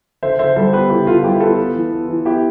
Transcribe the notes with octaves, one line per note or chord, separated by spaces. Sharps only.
D3 C5 E5
D3 C5 E5
G3 A4 C5
C5
B3 G4 B4
D3 E4 G4
D3 F4
G3 E4 G4
B3 F4 A4
B3
E3
B3
E3
B3 E4 G4